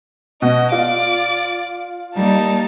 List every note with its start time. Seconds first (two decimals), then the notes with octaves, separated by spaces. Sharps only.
0.42 B2 D#5
0.72 F4 D5 D6
2.15 G3 A#3 D#4 A5